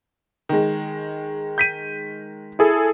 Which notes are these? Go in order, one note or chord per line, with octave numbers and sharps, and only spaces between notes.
D#3 G#3
G6 B6 D#7
E4 G#4 A4